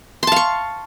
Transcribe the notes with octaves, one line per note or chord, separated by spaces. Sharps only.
F5 A5 C6 C#6